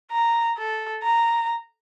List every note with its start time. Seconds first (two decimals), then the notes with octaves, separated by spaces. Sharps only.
0.12 A#5
0.58 A4
1.03 A#5